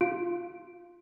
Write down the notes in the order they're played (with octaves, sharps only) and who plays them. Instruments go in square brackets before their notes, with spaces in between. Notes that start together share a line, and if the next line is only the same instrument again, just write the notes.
[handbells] F4 D7